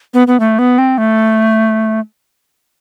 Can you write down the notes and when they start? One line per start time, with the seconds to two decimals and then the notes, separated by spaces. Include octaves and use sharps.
0.14 B3
0.27 B3
0.40 A3
0.59 B3
0.78 C4
0.98 A3